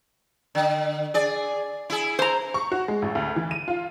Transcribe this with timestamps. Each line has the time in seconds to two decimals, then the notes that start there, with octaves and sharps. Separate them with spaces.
0.55 D3
1.14 G#4 D5
1.90 E4 G#4
2.19 C5 A#5
2.54 C#6
2.72 F#4
2.88 G#3
3.02 A1
3.15 D2
3.36 E3
3.51 D#7
3.68 F4